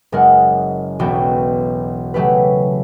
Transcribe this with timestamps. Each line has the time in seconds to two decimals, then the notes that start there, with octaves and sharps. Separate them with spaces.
0.12 F#1 G#3 A#4 F#5
0.99 E1 B1 B3 F#4 G5
2.14 C#3 F#3 A3 G4 B4